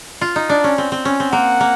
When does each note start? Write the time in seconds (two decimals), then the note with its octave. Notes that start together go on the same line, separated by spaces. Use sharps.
0.21 F4
0.36 D#4
0.49 D4
0.64 C#4
0.78 C4
0.92 C4
1.05 C#4
1.20 C4
1.33 A#3 F#5
1.60 A#3